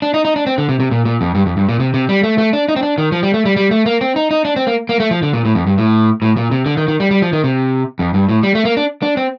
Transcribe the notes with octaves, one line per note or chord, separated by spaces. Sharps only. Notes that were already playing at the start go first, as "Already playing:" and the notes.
D4
D#4
D#4
D4
C4
D3
C3
C3
A#2
A#2
F2
G2
F2
G2
A#2
C3
C3
G3
A3
A3
D4
D#4
C4
D4
D#3
F3
G3
A3
G3
G3
A3
A#3
C4
D#4
D#4
D4
C4
A#3
A#3
A3
F3
D3
A#2
A2
F2
G2
A2
A2
A#2
C3
D3
D#3
D#3
G3
G3
F3
D#3
C3
F2
G2
A2
G3
A3
A#3
D4
D4
C4